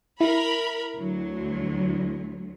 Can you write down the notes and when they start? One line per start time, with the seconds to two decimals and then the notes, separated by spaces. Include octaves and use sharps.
0.21 E4 A#4 B5
0.97 D2 F#3